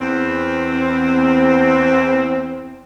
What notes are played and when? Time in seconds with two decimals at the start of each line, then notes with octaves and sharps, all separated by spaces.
0.01 E2 C4